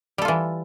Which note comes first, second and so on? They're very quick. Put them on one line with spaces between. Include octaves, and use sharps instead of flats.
G3 A4 F4 E3